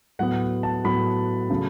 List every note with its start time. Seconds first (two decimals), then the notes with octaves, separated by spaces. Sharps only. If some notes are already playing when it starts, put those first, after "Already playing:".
0.19 A2 F#3 B3 F#5
0.63 A5
0.84 A2 F#3 B3 B5
1.50 C#3 F#3 A3